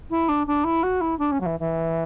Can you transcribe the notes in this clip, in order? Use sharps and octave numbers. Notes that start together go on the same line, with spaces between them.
E4
D4
D4
E4
F#4
E4
D4
C#4
F#3
E3
E3